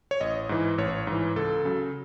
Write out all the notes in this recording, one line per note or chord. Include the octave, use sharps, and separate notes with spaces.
C#5
A1 D#5
G#2 E3
A1 C#5
G#2 E3
C#2 A4
C#3 F#3